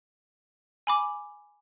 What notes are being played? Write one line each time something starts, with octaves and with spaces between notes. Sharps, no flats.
G#5 B5 D6